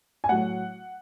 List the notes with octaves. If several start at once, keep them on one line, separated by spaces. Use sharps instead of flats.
G#5
A2 F#3 F#5